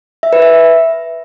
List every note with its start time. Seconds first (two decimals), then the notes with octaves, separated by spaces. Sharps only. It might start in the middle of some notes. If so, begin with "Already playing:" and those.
0.23 E5
0.33 B4
0.42 E5